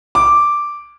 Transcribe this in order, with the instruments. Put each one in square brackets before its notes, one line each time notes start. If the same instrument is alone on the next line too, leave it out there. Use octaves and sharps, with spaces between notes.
[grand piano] D6